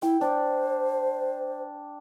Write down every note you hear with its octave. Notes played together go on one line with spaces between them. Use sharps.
E4 G5
D4 C5